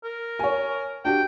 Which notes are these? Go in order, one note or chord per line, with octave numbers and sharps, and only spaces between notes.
A#4
C#5 G#5
D4 F#4 G4 G5